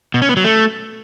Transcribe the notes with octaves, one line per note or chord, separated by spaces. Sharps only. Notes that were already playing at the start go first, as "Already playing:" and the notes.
B2
C#4
B3
F#3
A3